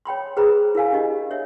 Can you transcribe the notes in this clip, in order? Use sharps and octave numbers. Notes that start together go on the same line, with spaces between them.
C#5 G5 B5 C6
G#4 B4 C5 A#5 B5
E4 A#4 F5 G#5
D4 G4 D#5
C#5 E5